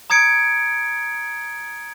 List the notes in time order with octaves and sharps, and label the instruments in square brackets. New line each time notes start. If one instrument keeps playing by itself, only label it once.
[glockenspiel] A#5 D#6 G#6 C#7 D7